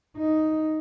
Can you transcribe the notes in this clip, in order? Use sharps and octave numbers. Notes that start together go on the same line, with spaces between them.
D#4